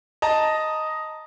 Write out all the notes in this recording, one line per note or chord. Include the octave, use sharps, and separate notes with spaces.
D#5 A5 A#5